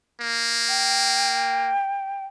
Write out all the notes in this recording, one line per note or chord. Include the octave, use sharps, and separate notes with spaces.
A#3
G5